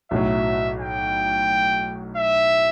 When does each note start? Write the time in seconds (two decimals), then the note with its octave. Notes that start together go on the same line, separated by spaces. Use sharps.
0.11 B1 A2 F#3 E5
0.79 G5
2.16 E5